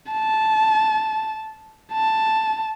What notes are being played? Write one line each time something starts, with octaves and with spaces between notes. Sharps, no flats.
A5
A5